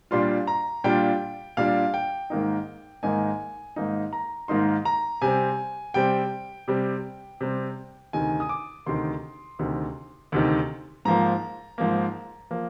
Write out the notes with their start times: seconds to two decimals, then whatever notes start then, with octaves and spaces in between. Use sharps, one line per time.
0.11 A#2 G3 D4 F4 C6
0.47 A#5
0.84 A#2 G3 D4 F4 G5
1.57 A#2 G3 D4 F4 F5
1.94 G5
2.30 G#2 D#3 A#3 D#4
3.03 G#2 D#3 A#3 D#4 G#5
3.76 G#2 D#3 A#3 D#4
4.13 A#5
4.48 G#2 D#3 A#3 D#4 C6
4.85 A#5
5.22 C3 G3 C4 G#5
5.94 C3 G3 C4 G5
6.68 C3 G3 C4
7.41 C3 G3 C4
8.13 D2 C3 D#3 G#5
8.40 D#6
8.49 D6
8.86 D2 C3 D#3 C6
9.59 D2 C3 D#3
10.32 D2 C3 D#3
11.05 G#2 F3 A#3 A#5
11.78 G#2 F3 A#3
12.51 F3 A#3